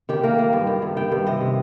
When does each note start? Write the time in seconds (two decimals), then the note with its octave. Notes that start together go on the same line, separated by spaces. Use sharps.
0.09 D#3 G4
0.23 A#3 A#4
0.38 A#3
0.53 G2
0.67 D#3
0.82 G2
0.97 D#3 G5
1.12 G2
1.27 C3 D#5
1.41 C3